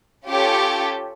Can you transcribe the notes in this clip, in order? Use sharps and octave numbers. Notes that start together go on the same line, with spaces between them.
C#4 F4 G4 A4 C#5